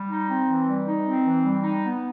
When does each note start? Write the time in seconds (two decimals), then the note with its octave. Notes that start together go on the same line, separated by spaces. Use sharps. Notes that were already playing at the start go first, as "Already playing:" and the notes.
Already playing: G3
0.09 D#4
0.29 C4
0.47 E3
0.67 G3
0.86 D#4
1.05 C4
1.24 E3
1.44 G3
1.62 D#4
1.82 B3